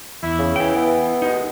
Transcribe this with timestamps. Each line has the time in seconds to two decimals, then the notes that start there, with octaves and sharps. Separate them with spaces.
0.23 E2 E4
0.39 C#3
0.56 E3 E4 G5
0.75 B3
1.22 D#2 B2 G#3 D#4